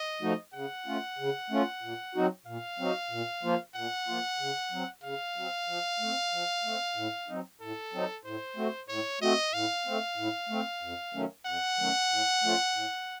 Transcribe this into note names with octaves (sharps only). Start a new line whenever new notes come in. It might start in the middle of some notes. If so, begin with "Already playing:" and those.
Already playing: D#5
F3 A3 D#4 F#4
C#3 F#5
A3 C#4 F4
C#3
A3 C#4 F4
A#2
F#3 C4 D#4 F#4
A#2 F5
F#3 C4 D#4 F#4
A#2
F3 A#3 F4
A#2 F#5
F3 A#3 F4
C#3
F#3 C4
C#3 F5
F#3 C4
F3
A3 C4
F3
A3 C4
A2
F#3 C4 D#4
A2 A4
F#3 C4 D#4
A2 C5
A3 C4 F#4
A2 C#5
A3 C4 F#4 D#5
A2 F5
A3 C4
A2
A3 C4
F2
D#3 F#3 A3 C#4
F2 F#5
D#3 F#3 A3 C#4
A2
F3 A3 C#4 F4
A2